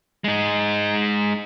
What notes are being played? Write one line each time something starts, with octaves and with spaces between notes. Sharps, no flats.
G#3 D#4